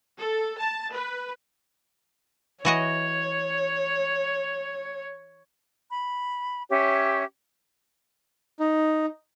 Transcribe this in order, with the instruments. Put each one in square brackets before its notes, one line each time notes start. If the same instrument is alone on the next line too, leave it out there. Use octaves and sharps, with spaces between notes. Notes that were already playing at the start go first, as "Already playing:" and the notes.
[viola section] A4
A5
B4
[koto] E3 F#4 D#5 [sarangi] C#5
[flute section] B5
C#4 G4 C#5 E5
[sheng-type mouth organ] D#4